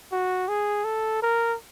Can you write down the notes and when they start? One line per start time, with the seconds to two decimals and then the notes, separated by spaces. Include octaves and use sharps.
0.12 F#4
0.48 G#4
0.85 A4
1.22 A#4